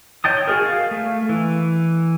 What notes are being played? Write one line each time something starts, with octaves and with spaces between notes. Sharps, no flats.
C#5 D#5 G5 A5 D#6
F#4 G#4 A#4
F5
A3
E3